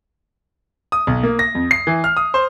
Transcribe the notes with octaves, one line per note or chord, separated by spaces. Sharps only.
D#6
B1
A#3
A#6
F2
C7
E3
F6
D#6
C5